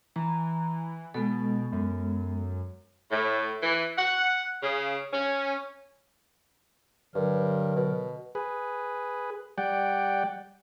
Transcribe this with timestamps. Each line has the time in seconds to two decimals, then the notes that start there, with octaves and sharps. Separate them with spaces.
0.16 E3 A#5
1.14 B2 G#3 B3 A4
1.72 F#2
3.11 A2
3.61 E3
3.96 F#5
4.61 C#3
5.11 C#4
7.15 G2 D3 F#3 A#4
7.76 B2
8.35 G#4 B4
9.58 G3 D5 F#5 G5